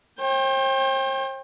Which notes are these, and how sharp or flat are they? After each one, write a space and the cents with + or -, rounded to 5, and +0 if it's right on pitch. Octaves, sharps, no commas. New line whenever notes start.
C5 +45 G5 +20